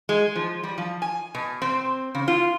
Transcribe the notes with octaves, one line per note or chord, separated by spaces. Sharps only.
G#3
F3
G3
F3
G#5
B2
C4
C#3
F4